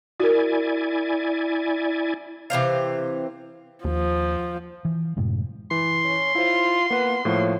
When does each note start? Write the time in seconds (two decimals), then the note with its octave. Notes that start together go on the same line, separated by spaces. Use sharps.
0.20 E4 F#4 A#4 D5 G#5
2.50 C3 E3 C5 F5
3.84 D#2 F3
4.85 E3
5.17 F#2 A2 C3 G#3
5.71 E3 C6
6.04 C#4
6.35 E4 F4 C5
6.90 A#3 B3 B4
7.25 A2 F3 A#3 C#5